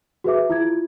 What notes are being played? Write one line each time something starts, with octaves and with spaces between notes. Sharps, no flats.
F#4 G#4 B4 E5 D6
E4 F4 G#6